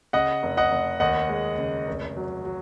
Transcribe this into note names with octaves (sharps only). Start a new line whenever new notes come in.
C#3 D#5 F#5
F1
D#5 F#5
F1
D#2 D#5 F#5
G#3
C#3
F1
F#3
F#3